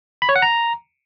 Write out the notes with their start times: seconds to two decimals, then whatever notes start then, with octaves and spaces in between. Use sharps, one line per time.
0.22 B5
0.29 C#5
0.36 F#5
0.42 A#5